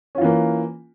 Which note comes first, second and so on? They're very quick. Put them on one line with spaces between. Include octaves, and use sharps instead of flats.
C#4 F4 E3 A#3